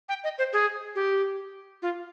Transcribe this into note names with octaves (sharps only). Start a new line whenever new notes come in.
G5
D#5
C5
G#4
G4
F4